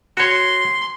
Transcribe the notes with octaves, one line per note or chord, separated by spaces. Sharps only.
F#4 C#5 C6